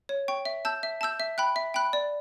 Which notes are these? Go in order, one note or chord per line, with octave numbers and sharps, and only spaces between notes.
C#5
G5 C#6
E5
A5 E6 G6
E5
A5 E6 G6
E5
G5 B5 F#6
E5
G5 B5 F#6
D5